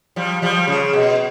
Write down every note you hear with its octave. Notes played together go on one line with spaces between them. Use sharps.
F3 G3
F3 G3
C#3
B2